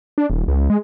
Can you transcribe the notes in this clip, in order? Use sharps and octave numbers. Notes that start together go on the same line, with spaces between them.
D4
D#1
C#2
G#3